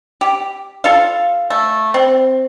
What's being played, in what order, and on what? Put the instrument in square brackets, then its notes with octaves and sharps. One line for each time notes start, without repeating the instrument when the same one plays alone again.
[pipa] G4
F4 A4 F5
A3
C4